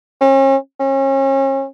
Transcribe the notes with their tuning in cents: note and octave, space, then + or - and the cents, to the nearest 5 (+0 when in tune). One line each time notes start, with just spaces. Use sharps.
C#4 -40
C#4 -35